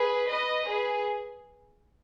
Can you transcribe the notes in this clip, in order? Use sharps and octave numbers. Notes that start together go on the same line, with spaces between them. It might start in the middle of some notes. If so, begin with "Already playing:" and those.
Already playing: G#4 B4
B4 D#5
G#4 B4